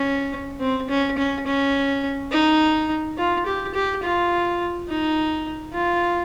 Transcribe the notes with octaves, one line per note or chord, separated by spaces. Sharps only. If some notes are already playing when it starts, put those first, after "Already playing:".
Already playing: C#4
C4
C#4
C#4
C#4
D#4
F4
G4
G4
F4
D#4
F4